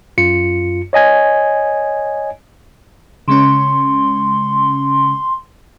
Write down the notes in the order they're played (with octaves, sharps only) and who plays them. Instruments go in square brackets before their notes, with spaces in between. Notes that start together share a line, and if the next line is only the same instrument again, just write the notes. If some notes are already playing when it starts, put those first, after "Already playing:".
[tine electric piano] F#2 F4 C#7
C#5 D#5 G#5 G#6
[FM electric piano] C#3 G#3 C#4 [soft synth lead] C6